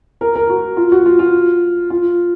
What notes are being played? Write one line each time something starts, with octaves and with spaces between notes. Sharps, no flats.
A#4
A#4
F#4
F4
F#4
F4
F4
F4